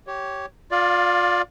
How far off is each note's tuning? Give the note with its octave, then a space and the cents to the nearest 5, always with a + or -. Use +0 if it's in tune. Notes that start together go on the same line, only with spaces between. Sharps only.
G4 -15 C#5 +0
F4 +30 D5 +0 F5 +0